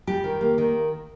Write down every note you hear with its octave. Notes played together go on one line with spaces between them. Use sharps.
G3 G4
D#3
A#3
D#3